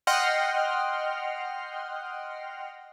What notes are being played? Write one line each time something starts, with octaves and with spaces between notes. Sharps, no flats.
D#5 F#5 G5 C6 F6